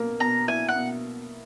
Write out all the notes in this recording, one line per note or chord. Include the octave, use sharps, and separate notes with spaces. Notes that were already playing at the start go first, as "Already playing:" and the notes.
Already playing: B2 A#3
B2 A#5
E4 G#5
F#5
B2